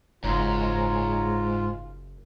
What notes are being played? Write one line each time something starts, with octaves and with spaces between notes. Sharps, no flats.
F#1 G#2 F4 C#5 A#5